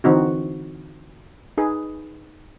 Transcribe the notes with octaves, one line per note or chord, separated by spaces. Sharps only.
D3 E3 C4 D#4 F#4
D#4 G#4 B4